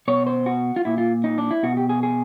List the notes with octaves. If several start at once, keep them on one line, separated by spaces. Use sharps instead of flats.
B2 C#5
C5
F#4
F4
A#2 E4
F4
D#4
D4
E4
B2 F#4
G4
G#4
G#4